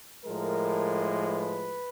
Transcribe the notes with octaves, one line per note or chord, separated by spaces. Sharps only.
A2 F3 G#3 A#4
B4